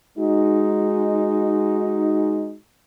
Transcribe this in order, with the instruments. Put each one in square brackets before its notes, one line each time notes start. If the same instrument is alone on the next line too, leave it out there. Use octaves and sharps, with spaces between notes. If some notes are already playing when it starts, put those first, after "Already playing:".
[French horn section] G#3 D#4 F#4